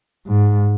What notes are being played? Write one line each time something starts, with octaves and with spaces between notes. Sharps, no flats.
G#2